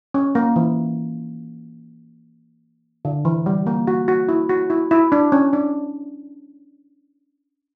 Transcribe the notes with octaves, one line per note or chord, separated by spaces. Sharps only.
C#4
A#3
E3
D3
E3
G3
A#3
F#4
F#4
E4
F#4
E4
E4
D4
C#4
D4